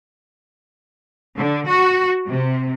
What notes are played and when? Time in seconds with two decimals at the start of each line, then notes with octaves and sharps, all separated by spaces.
1.36 D3
1.67 F#4
2.30 C3